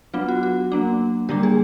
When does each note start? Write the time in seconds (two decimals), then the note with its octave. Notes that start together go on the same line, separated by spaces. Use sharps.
0.14 F#3 B3 D4 F4
0.28 F#4
0.43 F#4
0.72 F#3 A#3 D4
1.29 D3 G3 A#3 D4 G4
1.43 G#4